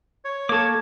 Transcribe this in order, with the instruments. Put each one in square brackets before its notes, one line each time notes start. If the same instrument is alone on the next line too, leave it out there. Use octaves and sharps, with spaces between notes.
[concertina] C#5
[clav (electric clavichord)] A#3 A4 [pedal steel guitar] A5 D6 [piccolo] G#6